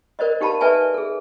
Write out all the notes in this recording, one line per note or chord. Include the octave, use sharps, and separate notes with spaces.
A#4 C5 D5 D#5
D#4 G4 F5 A5 B5
A4 B4 D5 E5 G#5 A5
G#4 A4